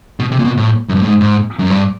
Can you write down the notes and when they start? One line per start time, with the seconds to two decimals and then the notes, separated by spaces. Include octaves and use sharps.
0.20 B2
0.32 C3
0.39 A#2
0.44 B2
0.57 A2
0.89 F#2
0.95 G2
1.02 A2
1.07 G#2
1.20 G#2
1.59 F#2
1.70 G2